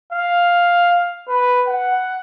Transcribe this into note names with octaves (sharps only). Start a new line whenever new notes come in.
F5
B4
F#5